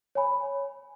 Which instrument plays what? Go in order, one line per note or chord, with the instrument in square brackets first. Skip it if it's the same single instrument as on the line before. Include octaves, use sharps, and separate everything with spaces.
[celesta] C#5 G#5 B5